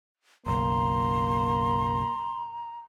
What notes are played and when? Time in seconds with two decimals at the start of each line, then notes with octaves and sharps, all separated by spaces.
0.46 F#1 B1 A#3 A#5 C6